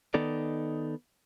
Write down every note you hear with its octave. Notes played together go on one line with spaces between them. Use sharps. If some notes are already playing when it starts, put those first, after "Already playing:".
D#3 B3 D#4 A4 D5